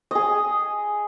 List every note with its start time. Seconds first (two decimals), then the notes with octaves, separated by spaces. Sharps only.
0.11 G#4 D#5